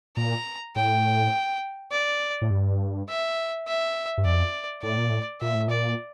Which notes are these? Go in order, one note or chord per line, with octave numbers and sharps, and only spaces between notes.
A#2 A#5
A2 G5
D5
A2
G2
E5
E5
G2
F2 D5
A2 D5
A#2
A2
A#2 E5
A2
A#2 D5